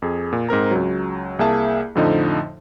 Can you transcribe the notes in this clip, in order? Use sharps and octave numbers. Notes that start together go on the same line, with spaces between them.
F2 G#4
A#2
G#2 C4 A#4 A#5
C#2 F#3
C2 A#3 G#4 E5 A5
F2 A2 D3 F3 D#4 D#5